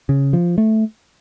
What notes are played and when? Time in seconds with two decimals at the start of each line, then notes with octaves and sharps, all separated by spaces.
0.09 C#3
0.33 F3
0.58 A3